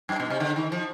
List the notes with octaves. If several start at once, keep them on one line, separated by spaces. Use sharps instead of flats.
F#2
B2
C3
D3
D#3
F3